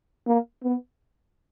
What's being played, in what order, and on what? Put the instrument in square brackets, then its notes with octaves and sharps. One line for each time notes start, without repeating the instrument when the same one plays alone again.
[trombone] A#3
B3